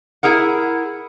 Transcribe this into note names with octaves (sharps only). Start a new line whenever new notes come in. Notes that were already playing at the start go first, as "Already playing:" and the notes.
E4 G#4 A#4 F#5